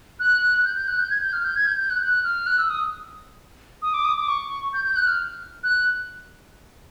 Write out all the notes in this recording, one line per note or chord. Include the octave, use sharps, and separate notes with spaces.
F#6
G6
G6
F#6
G6
G#6
G6
F6
G6
G#6
G6
G6
F#6
F#6
F6
F#6
E6
D#6
D#6
D6
D#6
D6
C#6
G6
G6
F#6
F6
F#6